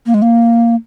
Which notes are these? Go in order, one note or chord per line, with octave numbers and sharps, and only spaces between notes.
A#3
G#3
A#3